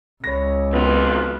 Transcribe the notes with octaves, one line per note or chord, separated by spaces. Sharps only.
C#2 C#5 B5 A#6
B1 B3 C4 F4 B4